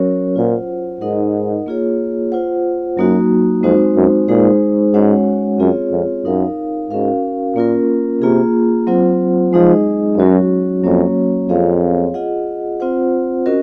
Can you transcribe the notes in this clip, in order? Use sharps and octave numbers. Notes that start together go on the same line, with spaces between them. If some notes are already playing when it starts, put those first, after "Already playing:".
Already playing: F#3 C#4 F#4 A#4 C#5
A#2 F4 C5 F#5
G#2 D#4 A#4 D#5 F#5
A#3 F4 G#4 C#5
F4 C5 F#5
F#2 F#3 A#3 D#4 F#4
F2 G#3 C4 D#4 F#4 C5
F#2
A#2 G#3 D#4 G#4 C5
G#2 G#3 C#4 F#4 C#5 F#5
F#2 C4 F4 G#4 C#5
F2
F#2 D#4 A#4 F5
G#2 C#4 F#4 A#4 F5
A#2 A#3 C#4 F4 A#4
C3 A#3 F4 G#4
F#3 C4 F4 C5 F#5
F3 G#3 D#4 G#4 D#5
F#2 F#3 C#4 F#4 C#5
F2 F#3 A#3 C#4 F#4 C#5
F2 C4 F4 G#4 C#5 F5
F4 G#4 D#5 F#5
C4 F4 C5 F#5
C#4 F#4 A#4 D#5